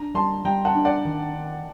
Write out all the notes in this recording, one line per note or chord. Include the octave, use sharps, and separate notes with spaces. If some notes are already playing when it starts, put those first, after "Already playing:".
Already playing: D4 A#5
G3 A5 C6
G3 G5 A#5
F#5 A5
D4
D5 F#5
D#3